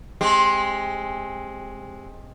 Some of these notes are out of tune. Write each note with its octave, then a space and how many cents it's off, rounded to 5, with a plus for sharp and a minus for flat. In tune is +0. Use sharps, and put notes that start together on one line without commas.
G#3 +5 C4 +15 G4 +25